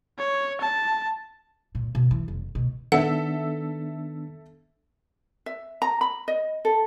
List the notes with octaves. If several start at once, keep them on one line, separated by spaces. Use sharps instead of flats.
C#5
A5
A#2
B2
E3
F1
B2
D#3 B3 D4 A4 E5 F#5
E5
A#5
B5
D#5
A4